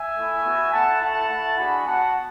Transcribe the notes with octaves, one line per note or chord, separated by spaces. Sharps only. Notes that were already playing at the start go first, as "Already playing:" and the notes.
Already playing: E5 G#5
A3 E4
B3 F#4
A3 E4 F#5 A5
A3 E4 F#5 A5
A3 E4
G#3 D4 F#4 G#5 B5
B3 F#4 F#5 A5